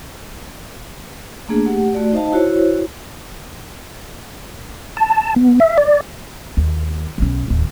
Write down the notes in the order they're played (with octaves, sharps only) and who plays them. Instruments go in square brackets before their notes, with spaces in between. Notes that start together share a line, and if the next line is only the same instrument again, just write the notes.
[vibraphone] A3 A#3 D4 G#4
A3 G4 F#5
A3 F#4 D5
D#4 C5 D#5 F5 A5
E4 F#4 C5 C#5
[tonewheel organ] A5
B3
E5
D5
[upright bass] D#2
B1 C#4
D1 D#2